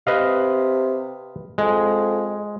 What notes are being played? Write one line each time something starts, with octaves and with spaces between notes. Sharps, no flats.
C3 B4 D#5 F5
F2 G#3